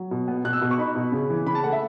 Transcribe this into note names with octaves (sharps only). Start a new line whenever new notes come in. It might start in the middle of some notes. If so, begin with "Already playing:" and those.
Already playing: F#3
B2
B3
B2 F#6
E6
B2
C#6
D#4 B5
B2
C#3
E3
C#3 B5
A5
A3 F#5
E5